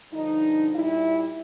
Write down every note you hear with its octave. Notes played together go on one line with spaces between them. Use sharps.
G2 D3 F3 D#4
A#2 G3 E4